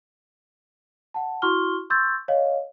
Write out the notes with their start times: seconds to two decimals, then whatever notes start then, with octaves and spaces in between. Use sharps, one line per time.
1.14 F#5 A5
1.42 E4 F#4 C6 C#6 F6 G7
1.90 C6 C#6 E6 G6 A6
2.28 C#5 D#5 F5